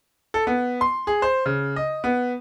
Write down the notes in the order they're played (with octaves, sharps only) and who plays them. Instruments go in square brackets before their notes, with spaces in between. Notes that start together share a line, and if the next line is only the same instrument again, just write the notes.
[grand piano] A4
B3
C6
G#4
C5
C#3
D#5
B3